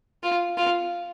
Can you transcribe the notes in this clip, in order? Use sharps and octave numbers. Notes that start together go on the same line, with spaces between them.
F4
F4